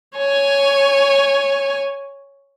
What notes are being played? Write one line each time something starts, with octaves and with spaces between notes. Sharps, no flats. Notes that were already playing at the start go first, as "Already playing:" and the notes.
C#5 G#5